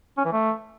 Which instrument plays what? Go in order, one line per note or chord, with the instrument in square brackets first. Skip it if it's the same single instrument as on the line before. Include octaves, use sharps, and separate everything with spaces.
[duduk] C#4
E3
A3